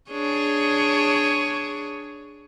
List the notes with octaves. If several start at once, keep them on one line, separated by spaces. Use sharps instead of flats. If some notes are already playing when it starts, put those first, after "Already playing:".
D4 G#4 C#5